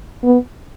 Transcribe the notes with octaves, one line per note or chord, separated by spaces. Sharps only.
B3